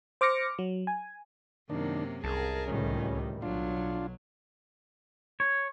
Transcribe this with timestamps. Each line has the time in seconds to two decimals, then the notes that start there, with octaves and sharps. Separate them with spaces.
0.21 C5 D6 F6 A#6 C#7
0.59 F#3
0.87 G#5
1.70 F#2 C3 D#3 A#3 D4
2.24 C2 G#4 A#4 A5
2.67 C#2 A2 D#3 G3 C#4
3.42 B1 F#3 D4 F4
5.40 C#5